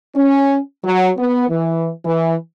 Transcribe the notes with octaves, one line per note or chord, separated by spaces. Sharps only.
C#4
F#3
B3
E3
E3